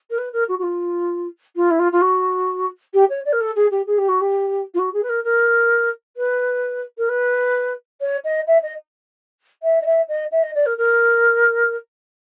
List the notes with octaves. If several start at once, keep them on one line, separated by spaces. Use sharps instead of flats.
A#4
B4
A#4
F#4
F#4
F4
F4
E4
F4
F4
F#4
G4
C#5
D5
A#4
A4
G#4
G4
G#4
G4
F#4
G4
F4
F#4
G#4
B4
A#4
A#4
B4
A#4
B4
C#5
D#5
E5
D#5
E5
D#5
E5
D#5
E5
D#5
D5
A#4
A#4